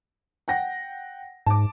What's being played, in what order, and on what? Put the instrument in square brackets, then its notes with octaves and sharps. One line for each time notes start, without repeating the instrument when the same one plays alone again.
[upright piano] F#5 G5 A#6
[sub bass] G#2 [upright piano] A5 D6